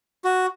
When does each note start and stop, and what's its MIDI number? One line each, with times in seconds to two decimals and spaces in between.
0.24 0.46 66